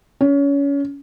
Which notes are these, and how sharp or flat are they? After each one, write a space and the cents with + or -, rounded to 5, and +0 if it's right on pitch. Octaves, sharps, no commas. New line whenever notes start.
C#4 +25